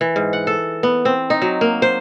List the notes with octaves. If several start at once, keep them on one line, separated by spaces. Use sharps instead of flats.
E3
G#2
F#5
A4
B3
C4
D#4
F#3
A#3
C5